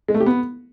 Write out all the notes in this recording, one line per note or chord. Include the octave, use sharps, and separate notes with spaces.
G#3
A3
G4
B3